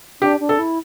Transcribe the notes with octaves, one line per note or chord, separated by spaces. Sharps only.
D4 G4
D4
A4
E4